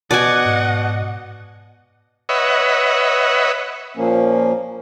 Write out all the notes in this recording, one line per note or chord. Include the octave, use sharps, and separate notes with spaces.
B2 D5 D#5 F#5 G#5
G#2
B4 C#5 D#5 E5 F#5
A#2 F3 A#3 C#4